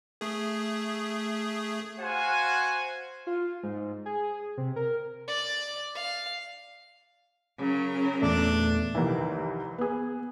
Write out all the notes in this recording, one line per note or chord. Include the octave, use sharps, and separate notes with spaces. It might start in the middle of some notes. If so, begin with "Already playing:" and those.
A3 G#4
F#4 C5 F5 F#5 G#5
F4
G#2
G#4
C3
A#4
D5
F5
C#3 F#3 A#4
E2 A#2 A3 D4
C2 F2 D#3 E3
B3 G#4